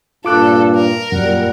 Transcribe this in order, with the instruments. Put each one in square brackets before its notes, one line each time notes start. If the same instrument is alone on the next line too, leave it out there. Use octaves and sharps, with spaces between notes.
[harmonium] G2 A#2 [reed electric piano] F4 D6 F#6 [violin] A4
[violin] A#4
[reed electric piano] F#2 [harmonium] A#2 G3 F#5